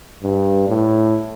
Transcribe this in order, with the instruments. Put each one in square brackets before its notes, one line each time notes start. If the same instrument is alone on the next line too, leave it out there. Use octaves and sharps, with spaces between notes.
[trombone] G2
A2